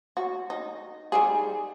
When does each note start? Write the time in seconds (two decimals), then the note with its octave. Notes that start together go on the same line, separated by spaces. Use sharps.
0.17 F#4
0.50 D#4
1.12 G3 D#4 G#4